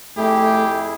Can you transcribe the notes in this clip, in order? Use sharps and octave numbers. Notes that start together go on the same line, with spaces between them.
F2 A3 E4 G4 G#4